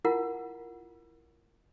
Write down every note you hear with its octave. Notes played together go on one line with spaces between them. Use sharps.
E4 F4 A#4 F#5